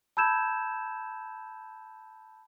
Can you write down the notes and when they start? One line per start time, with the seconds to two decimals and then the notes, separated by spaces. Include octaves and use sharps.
0.17 A5 B5 E6 G6 G#6 E7